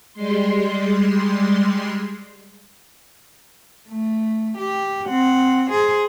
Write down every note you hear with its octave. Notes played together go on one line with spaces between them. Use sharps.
G3 G#3 C6
A3
G4
C4 F#5
G#4 C5